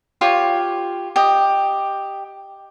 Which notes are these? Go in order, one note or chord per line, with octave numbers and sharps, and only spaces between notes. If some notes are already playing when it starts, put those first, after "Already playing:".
F4 G4 C#5
G4 D#5